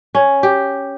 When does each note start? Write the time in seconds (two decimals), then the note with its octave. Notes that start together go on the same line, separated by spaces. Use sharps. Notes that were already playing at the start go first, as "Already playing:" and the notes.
0.15 C#4
0.43 G4